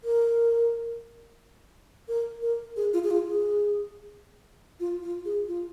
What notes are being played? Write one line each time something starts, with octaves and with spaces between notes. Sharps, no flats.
A#4
A#4
A#4
G#4
F4
G#4
F4
G#4
F4
F4
G#4
F4